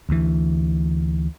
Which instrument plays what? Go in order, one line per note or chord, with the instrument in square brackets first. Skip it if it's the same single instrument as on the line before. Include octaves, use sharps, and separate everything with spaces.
[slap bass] D2 E3